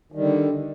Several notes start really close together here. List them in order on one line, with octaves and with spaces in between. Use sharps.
D#3 G3 D3